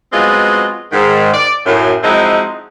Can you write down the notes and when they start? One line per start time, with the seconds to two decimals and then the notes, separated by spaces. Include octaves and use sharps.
0.12 F#3 G#3 B3 C4 F4 D#5
0.92 G#2 D#3
1.33 D5
1.65 F#2 A2
2.03 F3 F#3 G#3 C4 D#4 E4